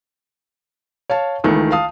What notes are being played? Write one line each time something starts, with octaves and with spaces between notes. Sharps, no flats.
C#5 F5 A5
C#2 D#3 E3 A3
F5 A5 D#6